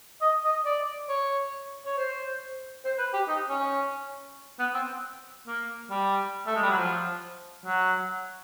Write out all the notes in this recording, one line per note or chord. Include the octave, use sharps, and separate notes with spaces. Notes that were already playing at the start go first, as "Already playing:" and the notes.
D#5
D#5
D5
C#5
C#5
C5
C5
B4
G4
D#4
C#4
B3
C4
A#3
G3
A3
G#3
G3
F#3
F3
F#3